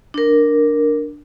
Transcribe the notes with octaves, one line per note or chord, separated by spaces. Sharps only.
D4 A#4